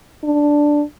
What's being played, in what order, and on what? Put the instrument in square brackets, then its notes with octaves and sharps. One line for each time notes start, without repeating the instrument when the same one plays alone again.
[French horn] D4